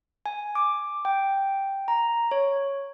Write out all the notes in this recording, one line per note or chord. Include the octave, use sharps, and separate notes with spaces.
G#5
D6
G5
A#5
C#5